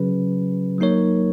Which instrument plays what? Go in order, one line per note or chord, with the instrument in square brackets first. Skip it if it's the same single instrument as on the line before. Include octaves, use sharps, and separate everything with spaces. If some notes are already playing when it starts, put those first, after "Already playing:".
Already playing: [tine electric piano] C#3 F#3 C#4 G#4 B4
F#3 A#3 D#4 A#4 C#5